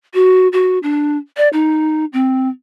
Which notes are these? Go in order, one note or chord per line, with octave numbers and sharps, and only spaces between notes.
F#4
F#4
D4
D5
D#4
C4